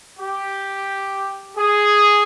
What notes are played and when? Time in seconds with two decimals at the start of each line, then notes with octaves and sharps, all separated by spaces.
0.17 G4
1.56 G#4